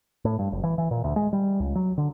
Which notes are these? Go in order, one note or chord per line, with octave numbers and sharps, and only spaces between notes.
A2
G2
F#1
E3
E3
A#2
D2
G#3
G3
C#2
F#3
D3